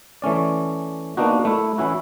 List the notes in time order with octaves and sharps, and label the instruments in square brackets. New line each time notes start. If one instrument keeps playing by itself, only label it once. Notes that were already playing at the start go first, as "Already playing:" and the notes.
[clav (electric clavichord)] E3 A3 C#4 D5
A#3 B3 D4 D#4 F#4
A3 E4
E3 C#4 E4 F#4